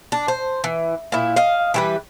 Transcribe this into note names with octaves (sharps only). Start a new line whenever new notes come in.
D4
C5
E3
A#2 E4
D#5 F5
E3 G3 B4